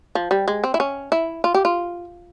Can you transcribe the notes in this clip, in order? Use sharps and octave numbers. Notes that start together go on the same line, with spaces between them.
F3
G3
G#3
C4
E4
C#4
E4
F4
G4
F4